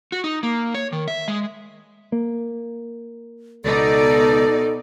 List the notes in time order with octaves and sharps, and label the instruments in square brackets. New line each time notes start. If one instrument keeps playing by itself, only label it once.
[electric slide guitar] F#4
D#4
A#3
C#5
D#3
E5
G#3
[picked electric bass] A#3
[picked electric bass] C#2 [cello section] B2 D#4 D5 [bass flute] A4